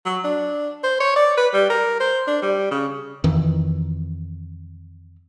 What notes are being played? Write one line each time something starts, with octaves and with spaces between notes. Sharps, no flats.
F#3
D4
C5
C#5
D5
B4
G3
A#4
C5
D4
G3
C#3
F2 D#3 E3